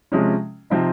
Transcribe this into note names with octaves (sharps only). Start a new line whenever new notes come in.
C3 F3 G#3 C#4
C3 F3 C4 D#4